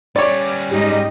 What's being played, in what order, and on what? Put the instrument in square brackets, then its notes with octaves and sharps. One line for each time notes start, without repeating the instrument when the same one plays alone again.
[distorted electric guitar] G3 C#4 [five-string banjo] C#5 D5 [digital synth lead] D6
[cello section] G#2 D#4 D#5 [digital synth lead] G4